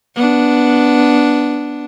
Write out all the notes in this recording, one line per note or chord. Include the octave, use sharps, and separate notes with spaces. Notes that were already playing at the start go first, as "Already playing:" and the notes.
B3 D4